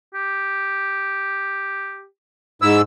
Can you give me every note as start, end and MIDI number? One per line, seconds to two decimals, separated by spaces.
0.14 2.05 67
2.62 2.81 44
2.62 2.77 64
2.62 2.81 88